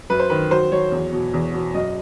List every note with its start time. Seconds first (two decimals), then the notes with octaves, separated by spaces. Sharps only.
0.10 F#2 B4
0.20 C5
0.30 D#3 B4
0.51 F#3 C5
0.71 F#3 C#5
0.92 E2
1.13 B2
1.34 E2
1.53 B2
1.74 F#2 D#5